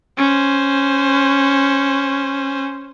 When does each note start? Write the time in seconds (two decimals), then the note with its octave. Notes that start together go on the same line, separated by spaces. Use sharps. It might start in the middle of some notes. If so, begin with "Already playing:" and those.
0.18 C#4 C5